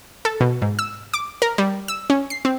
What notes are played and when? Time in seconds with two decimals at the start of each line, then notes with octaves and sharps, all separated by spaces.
0.25 A4
0.41 B2
0.62 G#2
0.79 E6
1.14 D6
1.42 A#4
1.58 G3
1.88 E6
2.10 C#4
2.30 C7
2.45 C4